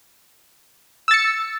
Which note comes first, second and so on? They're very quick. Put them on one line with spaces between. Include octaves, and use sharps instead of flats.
E6 A6 C#7